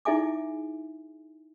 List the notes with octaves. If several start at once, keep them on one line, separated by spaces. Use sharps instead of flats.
D#4 E4 G#4 E5 G#5 D6